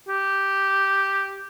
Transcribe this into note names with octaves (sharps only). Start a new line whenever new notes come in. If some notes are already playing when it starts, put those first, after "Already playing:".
G4